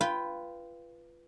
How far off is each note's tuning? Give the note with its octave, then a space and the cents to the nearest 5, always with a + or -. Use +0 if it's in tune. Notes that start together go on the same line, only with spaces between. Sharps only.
F4 -20 B4 +0 G5 +0